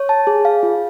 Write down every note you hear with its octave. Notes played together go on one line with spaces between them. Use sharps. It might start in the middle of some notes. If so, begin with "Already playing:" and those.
Already playing: C#5
A5
G#4
F5
F4